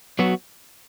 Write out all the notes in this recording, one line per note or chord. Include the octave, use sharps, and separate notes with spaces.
F#3 B3 F#4